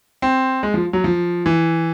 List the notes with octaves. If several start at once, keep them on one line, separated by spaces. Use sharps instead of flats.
C4
G#3
F3
F#3
F3
E3